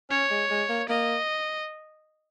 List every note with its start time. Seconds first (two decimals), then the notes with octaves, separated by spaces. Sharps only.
0.10 C#4 C#5
0.30 G#3
0.50 G#3
0.69 A#3
0.89 A#3 D#5